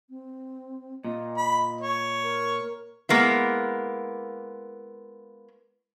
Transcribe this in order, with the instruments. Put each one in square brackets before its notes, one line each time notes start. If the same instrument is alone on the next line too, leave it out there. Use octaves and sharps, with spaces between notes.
[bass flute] C4
[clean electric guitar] A#2 [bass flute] D#5
[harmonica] B5
C#5
[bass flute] A#4
[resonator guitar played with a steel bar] G#3 A#3 B3 E4